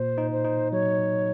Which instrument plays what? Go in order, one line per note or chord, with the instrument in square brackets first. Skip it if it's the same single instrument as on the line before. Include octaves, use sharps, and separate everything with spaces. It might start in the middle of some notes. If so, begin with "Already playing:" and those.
Already playing: [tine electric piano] A#2 [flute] C5
[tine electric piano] D#4
[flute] C5
[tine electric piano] D#4
[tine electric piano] F#3 [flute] C#5